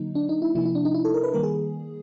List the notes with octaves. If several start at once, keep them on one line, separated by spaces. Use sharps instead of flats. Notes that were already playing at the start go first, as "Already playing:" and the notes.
Already playing: D3 F#3 A#3 D#4
D4
D#4
E4
C3 F3 A#3 E4
E4
D4
D#4
E4
A4
A#4
B4
D#3 G3 A#3 A#4
G#4